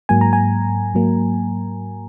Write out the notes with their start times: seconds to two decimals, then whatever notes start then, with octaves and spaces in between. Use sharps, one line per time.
0.09 G#2 F#3 A#3 G#5
0.21 A#5
0.33 G#5
0.94 G#2 F#3 A#3